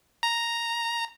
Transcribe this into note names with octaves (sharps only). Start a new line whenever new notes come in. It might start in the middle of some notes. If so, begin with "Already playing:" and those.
A#5